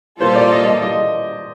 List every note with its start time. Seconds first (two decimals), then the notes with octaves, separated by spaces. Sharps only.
0.20 A#2 G3 A#3 F4 A4 C5
0.36 D5
0.52 D#5
0.67 D#5
0.82 D#5